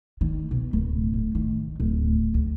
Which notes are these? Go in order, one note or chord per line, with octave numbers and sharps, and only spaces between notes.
D#3
B2
D1
A2
D#3
D1
D2